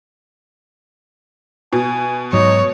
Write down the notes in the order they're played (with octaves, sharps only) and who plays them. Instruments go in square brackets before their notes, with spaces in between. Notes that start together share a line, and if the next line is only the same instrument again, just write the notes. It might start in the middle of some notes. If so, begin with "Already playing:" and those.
[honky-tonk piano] B2 [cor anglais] G#5
[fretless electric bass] G#2 F#3 [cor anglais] D#4 [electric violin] C#5